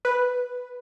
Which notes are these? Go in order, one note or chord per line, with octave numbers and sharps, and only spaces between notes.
B4